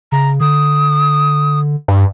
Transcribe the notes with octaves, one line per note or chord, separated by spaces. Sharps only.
C#3 A#5
D3 D#6
G2